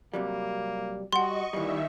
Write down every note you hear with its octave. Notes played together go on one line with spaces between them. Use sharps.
C3 F#3 G3 A#3
G3 F#4 D#5 F#5 C6 C#6
A#2 D#3 E3 G3 E5